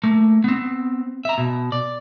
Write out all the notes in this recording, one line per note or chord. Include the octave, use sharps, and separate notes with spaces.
A3 A#3
B3 C4
E5 A#5
B2
D5